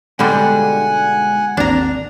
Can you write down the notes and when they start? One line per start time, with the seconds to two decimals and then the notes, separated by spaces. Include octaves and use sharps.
0.19 G#2 B2 D3 G3 G#3 D4 F#5 G#5
1.57 G#1 D#2 C4 D4 A#5